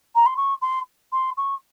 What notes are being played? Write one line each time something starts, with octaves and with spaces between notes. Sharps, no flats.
A#5
C6
C#6
C6
C6
C#6